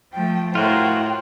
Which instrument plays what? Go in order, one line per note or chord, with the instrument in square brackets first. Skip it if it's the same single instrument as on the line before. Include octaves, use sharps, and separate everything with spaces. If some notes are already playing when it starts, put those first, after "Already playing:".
[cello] F3 A3 [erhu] G5
[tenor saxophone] A2 [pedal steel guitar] F4 F#4 [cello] A#4 C5 [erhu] G5